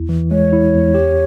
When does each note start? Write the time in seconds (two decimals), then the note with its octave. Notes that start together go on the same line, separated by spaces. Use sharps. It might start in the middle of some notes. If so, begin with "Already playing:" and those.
Already playing: E2 E4
0.09 E3
0.31 G#3 C#5
0.53 E4
0.73 E2
0.94 G4